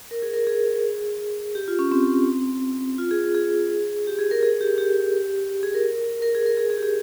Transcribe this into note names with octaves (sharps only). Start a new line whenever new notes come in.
A#4
G#4
A#4
G#4
G4
F4
C#4
C4
F4
G#4
G#4
G4
G#4
A#4
G#4
G4
G4
G#4
A#4
A#4
G#4
A#4
G#4
G#4
G4
G#4